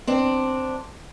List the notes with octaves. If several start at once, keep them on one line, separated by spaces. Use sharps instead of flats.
C4 D4